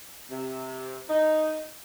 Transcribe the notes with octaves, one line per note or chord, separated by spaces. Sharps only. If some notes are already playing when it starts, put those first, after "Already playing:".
C3
D#4